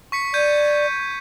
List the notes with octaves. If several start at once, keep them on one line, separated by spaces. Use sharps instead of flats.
C#6 B6 C#7
D5 G6 G#6 D#7